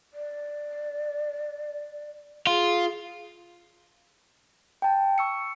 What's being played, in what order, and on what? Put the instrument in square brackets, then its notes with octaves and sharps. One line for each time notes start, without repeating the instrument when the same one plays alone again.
[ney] D5
[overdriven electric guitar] F4 [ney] G#4
[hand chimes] G5 A5
C#6 E6 C#7